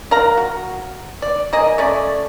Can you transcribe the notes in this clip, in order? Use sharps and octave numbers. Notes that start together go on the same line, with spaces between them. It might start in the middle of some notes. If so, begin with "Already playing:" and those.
A#4 F5 F#5 A#5
F#4
D5
A#3 G#4 D#5
A3 C#4 D5